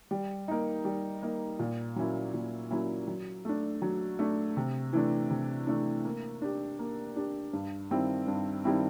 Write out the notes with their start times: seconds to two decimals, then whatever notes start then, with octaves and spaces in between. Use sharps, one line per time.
0.11 G3
0.48 A#3 D#4
0.85 G3
1.22 A#3 D#4
1.59 A#2
1.96 F#3 A#3 C#4 E4
2.34 A#2
2.71 F#3 A#3 C#4 E4
3.07 F#3
3.45 A3 D4
3.82 F#3
4.19 A3 D4
4.57 C3
4.93 E3 A3 D4
5.30 C3
5.67 E3 A3 D4
6.05 A#3
6.42 D4 G4
6.79 A#3
7.16 D4 G4
7.53 G2
7.91 D#3 G3 C4 E4
8.27 G2
8.64 D#3 G3 C4 E4